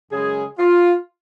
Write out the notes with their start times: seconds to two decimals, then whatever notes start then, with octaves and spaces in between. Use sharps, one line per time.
0.11 F#2 C#3 G#3 G#4
0.59 F4